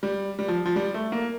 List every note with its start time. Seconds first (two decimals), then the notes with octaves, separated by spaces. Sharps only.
0.03 G3
0.39 G3
0.48 F3
0.65 F3
0.76 G3
0.94 A3
1.12 A#3